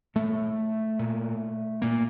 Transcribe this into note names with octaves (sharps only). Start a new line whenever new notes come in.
A#2 A3
A#2
A#2 A#3